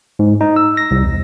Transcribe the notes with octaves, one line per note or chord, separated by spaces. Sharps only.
G#2
D#4
E6
A#6
C2
E2